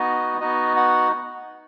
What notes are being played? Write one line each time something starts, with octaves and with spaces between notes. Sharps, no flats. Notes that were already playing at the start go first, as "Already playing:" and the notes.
Already playing: B3 D#4 F#4 D#5
B3 D#4 F#4 D#5
F#5